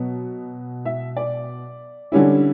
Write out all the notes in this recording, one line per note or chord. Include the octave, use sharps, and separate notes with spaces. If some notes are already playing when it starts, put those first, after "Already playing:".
Already playing: B2 F#3 B3
E5
D5
D3 G3 C#4 E4